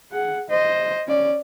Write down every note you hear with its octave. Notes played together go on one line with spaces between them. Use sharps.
G#4 F#5
C5 D#5
C#4 D5